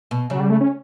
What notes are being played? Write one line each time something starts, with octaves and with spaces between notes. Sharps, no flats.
B2
C#3 F#3
G3
A3
C#4